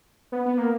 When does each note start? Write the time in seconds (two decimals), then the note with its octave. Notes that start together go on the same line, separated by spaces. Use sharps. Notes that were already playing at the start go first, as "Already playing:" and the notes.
0.32 B3
0.46 B3
0.58 A#3